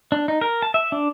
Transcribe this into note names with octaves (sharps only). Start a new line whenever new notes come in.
D4
D#4
A#4
A5
E5
D4